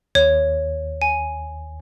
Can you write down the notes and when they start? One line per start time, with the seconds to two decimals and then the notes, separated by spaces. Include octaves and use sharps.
0.15 D#2 C#5
1.02 G#5